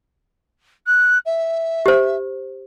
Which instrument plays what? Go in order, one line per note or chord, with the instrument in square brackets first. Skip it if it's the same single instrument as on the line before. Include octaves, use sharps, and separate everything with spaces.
[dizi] F#6
E5
[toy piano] G4 C5